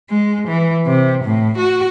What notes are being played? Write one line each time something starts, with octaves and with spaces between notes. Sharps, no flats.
G#3
E3
C3
A2
F#4